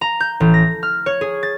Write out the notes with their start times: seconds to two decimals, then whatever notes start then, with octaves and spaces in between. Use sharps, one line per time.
0.01 A#5
0.20 G6
0.40 A1
0.54 A#6
0.83 F6
1.06 C#5
1.21 G#4
1.43 A6